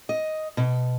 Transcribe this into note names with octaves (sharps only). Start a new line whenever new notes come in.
D#5
B2